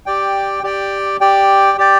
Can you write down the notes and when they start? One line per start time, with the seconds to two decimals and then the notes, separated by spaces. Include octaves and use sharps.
0.06 G4 D5 G5
0.63 G4 D5 G5
1.21 G4 D5 G5
1.78 G4 D5 G5